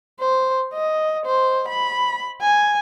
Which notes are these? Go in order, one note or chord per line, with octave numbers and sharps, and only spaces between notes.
C5
D#5
C5
B5
G#5